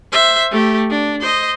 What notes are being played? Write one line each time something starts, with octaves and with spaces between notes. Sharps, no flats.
C5 E5
A3 G4
D4
C5 D#5